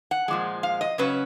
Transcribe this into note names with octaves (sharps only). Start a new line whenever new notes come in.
F#5
A#2 F3 G#3
F5
D#5
C#3 F#3 C#4 B4